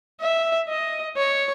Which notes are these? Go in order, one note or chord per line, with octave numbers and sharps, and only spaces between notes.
E5
D#5
C#5